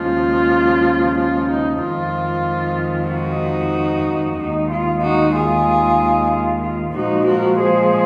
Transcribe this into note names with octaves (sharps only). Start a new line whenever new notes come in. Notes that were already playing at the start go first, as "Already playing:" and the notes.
Already playing: D#2 C#3 F3 G#3 F4
F4
D#4
F2 D#3 G#3 F4
D#4 F#4
D#2 D#3 G#3 D#4
F4
D#4 F#4
F4 G#4
F4
F4
A#2 F3 G#3 D#4 F#4
F#4 A#4
G#4 C5